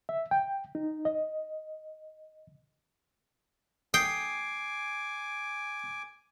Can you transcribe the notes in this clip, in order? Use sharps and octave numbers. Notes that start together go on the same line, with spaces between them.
E5
G5
D#4
D#5
G5 G#5 D6 D#6 C7